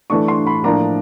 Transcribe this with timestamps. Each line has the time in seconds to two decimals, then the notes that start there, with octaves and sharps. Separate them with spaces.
0.10 E3 A3 D4 C#6
0.28 C6
0.47 B5
0.64 A2 F3 A#3 D4 A#5